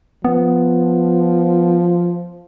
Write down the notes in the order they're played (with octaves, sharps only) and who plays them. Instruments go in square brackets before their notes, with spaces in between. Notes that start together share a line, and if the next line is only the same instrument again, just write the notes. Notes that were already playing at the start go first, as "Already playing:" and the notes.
[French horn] F3 [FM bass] B3